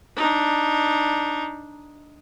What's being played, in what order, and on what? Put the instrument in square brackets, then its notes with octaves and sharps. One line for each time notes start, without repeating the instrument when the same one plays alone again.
[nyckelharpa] D4 D#4